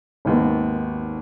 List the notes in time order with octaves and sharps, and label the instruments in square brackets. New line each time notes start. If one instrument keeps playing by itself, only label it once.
[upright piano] G#1 D#2 B3